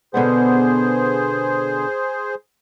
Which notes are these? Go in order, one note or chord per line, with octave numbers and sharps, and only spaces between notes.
B2 D3 B3 G#4 C5